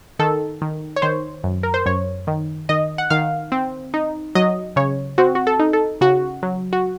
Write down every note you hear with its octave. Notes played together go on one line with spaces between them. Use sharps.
D#3 A4
D#3
C#5
D#3 C5
F#2
A#4
C5
F#2 C#5
D#3
D#3 D#5
F#5
D#3 F5
C4
D#4
F#3 D#5
C#3 C#5
C4 F#4
F#4
A4
D#4
A4
C#3 F#4
F#3
F#4